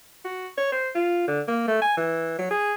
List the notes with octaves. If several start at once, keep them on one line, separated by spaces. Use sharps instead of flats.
F#4
C#5
C5
F4
D3
A#3
A3
G#5
E3
F#3
G#4